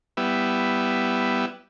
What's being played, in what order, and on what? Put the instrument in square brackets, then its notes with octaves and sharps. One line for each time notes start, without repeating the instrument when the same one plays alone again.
[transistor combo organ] G3 B3 E4